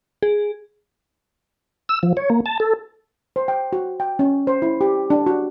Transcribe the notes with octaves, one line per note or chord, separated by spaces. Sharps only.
G#4
E6
F3
C#5
A#3
A5
A4
C5
G5
F#4
G5
C#4
C5
E4
G4
D4
F#4